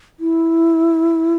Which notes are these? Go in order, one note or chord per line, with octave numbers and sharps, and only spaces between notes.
E4